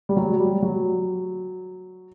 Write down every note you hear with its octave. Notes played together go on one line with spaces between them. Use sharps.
G3
F#3
G3
F#3